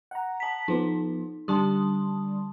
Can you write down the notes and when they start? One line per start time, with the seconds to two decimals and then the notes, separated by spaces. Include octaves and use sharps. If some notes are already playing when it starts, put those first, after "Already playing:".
0.11 F#5 A#5
0.40 A5 B6
0.68 F3 B3 D#4
1.48 D3 G3 A5 C6 D#6